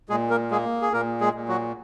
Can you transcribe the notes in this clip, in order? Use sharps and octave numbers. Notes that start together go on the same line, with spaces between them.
A#2 G#3 G#4
A#3 A#4
G#3 A#3 G#4
G#4
A#2 A#3 A#4
G#3 G#4
A#2
F#3 F#4